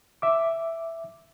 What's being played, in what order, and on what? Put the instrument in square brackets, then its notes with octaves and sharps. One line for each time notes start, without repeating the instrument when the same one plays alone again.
[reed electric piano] E5 D6